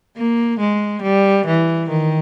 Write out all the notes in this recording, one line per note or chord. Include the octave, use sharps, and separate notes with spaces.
A#3
G#3
G3
E3
D#3